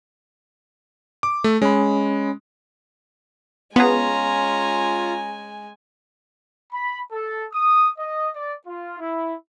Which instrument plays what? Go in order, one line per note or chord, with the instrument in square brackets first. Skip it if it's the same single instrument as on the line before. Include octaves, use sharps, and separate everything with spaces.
[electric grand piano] D6
A3
[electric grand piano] G#3 [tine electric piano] C#4 B5
[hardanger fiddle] G#3 G#5 [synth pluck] B3 G#4 [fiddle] C#4 A#5 [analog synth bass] F4
[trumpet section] B5
A4
D#6
D#5
D5
F4
E4